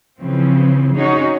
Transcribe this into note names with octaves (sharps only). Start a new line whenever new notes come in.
C#3 E3 F3 C4
C#4 D#4 F#4 G#4 C#5